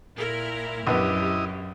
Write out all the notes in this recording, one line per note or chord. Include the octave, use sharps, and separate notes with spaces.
A#2 E4 A#4
A#1 F#2 B3 E4 G4 D#5